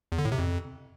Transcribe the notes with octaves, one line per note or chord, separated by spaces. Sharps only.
E2
D3
A2
C3
F2